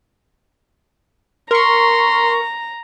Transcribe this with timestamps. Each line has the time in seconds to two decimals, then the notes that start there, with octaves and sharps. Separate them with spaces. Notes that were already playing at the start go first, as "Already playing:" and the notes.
1.51 A#4 A#5 C6 C#6